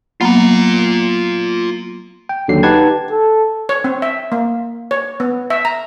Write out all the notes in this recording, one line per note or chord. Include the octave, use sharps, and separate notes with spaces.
F#3 A#3 B3 F4 A#5
G5
D#2 D3 F#3 C7
D#4 G4 B4 F#5 A5 G#6
A4
C#5
C4
E5
A#3
C#5
B3
E5
A#5